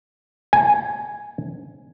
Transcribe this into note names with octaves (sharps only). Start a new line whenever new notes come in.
G#5